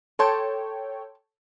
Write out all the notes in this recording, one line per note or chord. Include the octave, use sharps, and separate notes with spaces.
A4 C#5 G5 A5 C6 D6